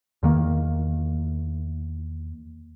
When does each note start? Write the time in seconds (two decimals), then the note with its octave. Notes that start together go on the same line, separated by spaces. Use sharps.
0.23 E2 D#3 A#3